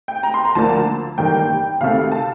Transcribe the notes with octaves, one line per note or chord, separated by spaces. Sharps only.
G5
A#5
C6
A#5
D2 D3 F3 A#3 A5
A1 G2 D#3 A#3 G5
D2 C3 D#3 A3 F5
A5